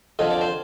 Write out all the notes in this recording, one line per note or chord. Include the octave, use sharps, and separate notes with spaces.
F2 D3 F3 D#5
D5
C5